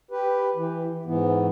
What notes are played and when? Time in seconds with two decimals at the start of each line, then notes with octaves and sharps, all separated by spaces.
0.11 G4 B4
0.55 E3
1.05 G#2 E3 B3